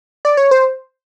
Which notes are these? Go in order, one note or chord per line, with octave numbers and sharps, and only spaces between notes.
D5
C#5
C5